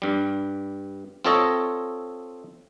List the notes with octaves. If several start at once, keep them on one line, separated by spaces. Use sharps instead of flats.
G2 G3
C4 F4 A4 C#5 D#5